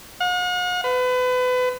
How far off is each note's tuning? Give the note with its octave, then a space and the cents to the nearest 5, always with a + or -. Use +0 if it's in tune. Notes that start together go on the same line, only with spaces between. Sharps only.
F#5 -45
B4 +30